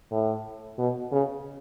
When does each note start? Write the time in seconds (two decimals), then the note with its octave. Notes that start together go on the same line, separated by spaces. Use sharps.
0.11 A2
0.78 B2
1.12 C#3